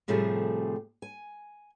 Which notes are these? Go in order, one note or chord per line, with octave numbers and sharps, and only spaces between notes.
A2 C3 F3 G3 A3 G#4
G#5